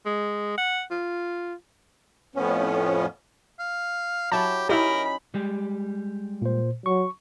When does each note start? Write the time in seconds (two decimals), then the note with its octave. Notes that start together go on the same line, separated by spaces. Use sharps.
0.06 G#3
0.58 F#5
0.91 F4
2.35 F2 A2 F3 B3 C#4
3.59 F5
4.32 F#3 E4 G4 C#5 A5
4.69 C#4 D#4 E4 G4 A#4 B5
5.34 G3 G#3 G4
6.42 A#2 C5
6.86 F#3 C#6